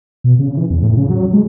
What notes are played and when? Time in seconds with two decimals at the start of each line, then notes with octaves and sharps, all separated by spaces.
0.24 B2
0.39 C#3
0.57 E3
0.70 E2
0.82 A2
0.97 C#3
1.10 F#3
1.33 G#3